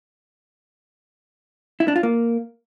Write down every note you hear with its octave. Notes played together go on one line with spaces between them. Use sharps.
E4
D4
F4
A#3